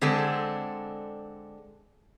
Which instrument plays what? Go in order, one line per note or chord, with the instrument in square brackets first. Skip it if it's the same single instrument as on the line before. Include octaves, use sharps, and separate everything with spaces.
[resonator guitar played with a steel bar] D3 G#3 C4 D4 A4